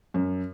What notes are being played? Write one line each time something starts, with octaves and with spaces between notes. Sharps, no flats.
F#2